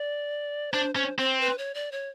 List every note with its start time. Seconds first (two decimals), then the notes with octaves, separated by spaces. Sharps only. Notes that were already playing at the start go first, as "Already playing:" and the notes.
Already playing: D5
0.72 D4 C5
0.95 C#4 C5
1.18 C4 C5
1.41 B4
1.58 C#5
1.74 D5
1.92 C#5